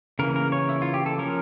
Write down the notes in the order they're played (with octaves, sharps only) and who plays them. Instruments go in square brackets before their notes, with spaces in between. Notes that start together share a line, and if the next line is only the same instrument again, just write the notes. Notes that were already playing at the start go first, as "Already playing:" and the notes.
[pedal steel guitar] C#3 E3 A#3 A#4
A#4
C#5
E4
F4
G4
A4
F3 A#3 C#4 A#4